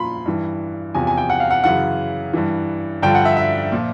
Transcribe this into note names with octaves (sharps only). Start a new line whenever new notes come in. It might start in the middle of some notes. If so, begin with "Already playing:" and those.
Already playing: A#2 F3 B5 C6
G2 E3
E2 C3 F3 G#5
G#5
G5
F#5
F5
F#5
F#2 C#3 E3 F#5
G2 E3
G2 D3 F3 G5
F#5
E5
E5
A#2 F3